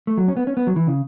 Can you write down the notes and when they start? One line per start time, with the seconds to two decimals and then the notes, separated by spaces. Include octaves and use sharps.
0.07 A3
0.17 F#3
0.28 C#4
0.37 B3
0.47 C#4
0.57 B3
0.67 F#3
0.76 E3
0.87 C#3